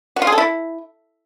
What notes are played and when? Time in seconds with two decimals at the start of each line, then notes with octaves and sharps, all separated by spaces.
0.16 F#4
0.22 F4
0.27 G#4
0.32 A4
0.38 E4